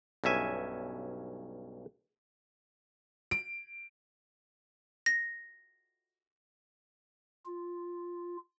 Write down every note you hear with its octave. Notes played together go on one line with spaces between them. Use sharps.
B1 G2 C#4 E5 G#5
D7
A#6
F4